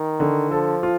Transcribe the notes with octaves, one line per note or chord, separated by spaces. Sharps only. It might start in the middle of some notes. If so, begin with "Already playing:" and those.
Already playing: D#3
D3
F3 A4
F4